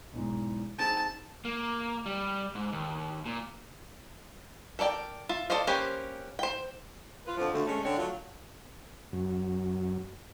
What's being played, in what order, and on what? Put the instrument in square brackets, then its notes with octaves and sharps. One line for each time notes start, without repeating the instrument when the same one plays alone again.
[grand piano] B1 E2 G#2
[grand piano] C4 D#4 G#4 [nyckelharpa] A5
[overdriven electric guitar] A#3
G3
G#2
D#2
A#2
[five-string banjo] A4 A#4 D5 G5
F4 E5
A4 C5 D5 D#5 F5
A#3 C#4 G4 B4 C5
C5 G5
[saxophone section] F4 B4
F2 D3 F3
D2 A3
G#3 A3 C#4
D3 C4 D4 C#5
F#3 A3 F4
[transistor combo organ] F#2